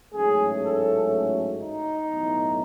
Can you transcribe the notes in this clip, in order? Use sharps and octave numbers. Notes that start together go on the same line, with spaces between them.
A1 G#2 F#3 A3 C#4 G#4
A4
D#4
B1 A2 E3